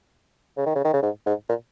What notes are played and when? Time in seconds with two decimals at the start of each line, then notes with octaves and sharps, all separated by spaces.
0.57 C#3
0.66 D#3
0.76 C#3
0.84 D#3
0.93 C#3
1.03 G#2
1.26 G#2
1.49 A#2